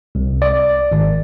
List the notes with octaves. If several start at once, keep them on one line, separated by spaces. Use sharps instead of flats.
C2
D5
G#1